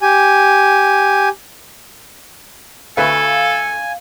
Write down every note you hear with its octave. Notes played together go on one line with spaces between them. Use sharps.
G4 G#5
D2 A3 A4 B4 F5 G#5